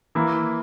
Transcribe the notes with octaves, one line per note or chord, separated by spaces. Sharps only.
E3 A#3 E4